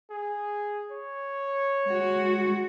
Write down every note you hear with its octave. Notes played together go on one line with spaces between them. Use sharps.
G#4
C#5
G#3 F#4